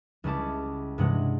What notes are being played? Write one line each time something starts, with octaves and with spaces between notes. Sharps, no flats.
C#2 G3 C#4 E4 A5 D6
G2 C3 E3 G#3 F#5